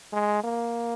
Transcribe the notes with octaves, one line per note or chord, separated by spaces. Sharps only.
G#3
A#3